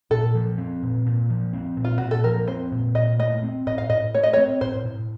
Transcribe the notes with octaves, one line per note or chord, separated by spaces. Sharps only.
A#2 A4
F3
C4
A#2
A#2
F3
C4
A#2
F4
A#2 F#4
A4
F3 A#4
C4 C5
A#2
A#2 D#5
A3 D#5
C4
A2 D#5
F5
A2 D#5
A3 C#5
D#5
C#5
C4
A2 C5
A2